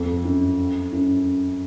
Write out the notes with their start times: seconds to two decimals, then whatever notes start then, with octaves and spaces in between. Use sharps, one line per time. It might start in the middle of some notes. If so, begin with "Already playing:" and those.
Already playing: F2
0.24 F#2
0.92 F#2